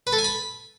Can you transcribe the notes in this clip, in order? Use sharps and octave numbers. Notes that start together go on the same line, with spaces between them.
B4
A4
G#5
B5